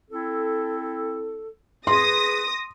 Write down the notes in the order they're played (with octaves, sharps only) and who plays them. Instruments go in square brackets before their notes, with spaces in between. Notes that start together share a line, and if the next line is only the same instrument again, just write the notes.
[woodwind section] C4 E4 A4
[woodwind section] G#4 B4 [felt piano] C6 [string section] D#6 A#6